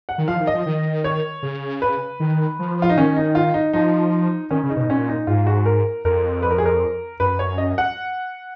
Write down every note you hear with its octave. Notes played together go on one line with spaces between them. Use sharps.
F#5
D#3
F3 F5
D#3
D#5
F3
D#3
C#5
C#3
B4
D#3
F3
F4
D#4
D#3 C#4
D#4
F4
D#4
F3 D#4
D#3 C#4
C#3
D#4
B2
D#4
A#2 C#4
D#4
G#2 F4
F#4
A#4
F2 A#4
B4
A#4
G#4
A#4
F#2 B4
C#5
D#5
F#5